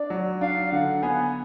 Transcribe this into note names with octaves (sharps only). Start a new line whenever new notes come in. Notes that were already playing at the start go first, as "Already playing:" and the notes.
Already playing: D4 D5
F#3
D4 F5
D3 F#5
B3 G#5